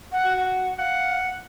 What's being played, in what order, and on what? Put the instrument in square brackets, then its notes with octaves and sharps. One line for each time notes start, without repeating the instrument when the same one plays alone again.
[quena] F#5
[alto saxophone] F#4
[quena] F#5
[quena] F5 [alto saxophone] F#5